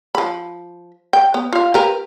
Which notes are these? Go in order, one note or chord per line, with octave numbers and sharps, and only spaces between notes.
F3 B5
G5
B3
F4 F5
G4 A#4 B4